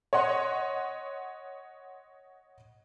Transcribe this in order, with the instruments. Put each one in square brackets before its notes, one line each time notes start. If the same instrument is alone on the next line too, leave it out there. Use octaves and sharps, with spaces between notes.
[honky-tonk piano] C#5 D#5 F#5 C6